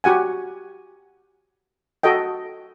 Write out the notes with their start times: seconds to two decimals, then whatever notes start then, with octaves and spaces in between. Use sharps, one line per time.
0.04 F#4 G4 F#5 G#5
2.03 F#4 A4 D#5 G5